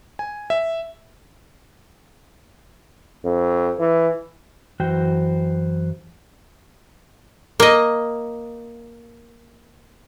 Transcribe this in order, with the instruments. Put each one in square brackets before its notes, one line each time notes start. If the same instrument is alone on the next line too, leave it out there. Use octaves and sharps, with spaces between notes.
[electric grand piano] G#5
E5
[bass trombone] F2
E3
[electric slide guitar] F#2 E3 F#4 C5 G5
[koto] A#3 D#5